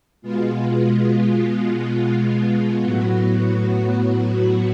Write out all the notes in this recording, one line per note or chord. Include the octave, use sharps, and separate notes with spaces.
B2 G#3 B3 F4
A2 F#3 B3 F#4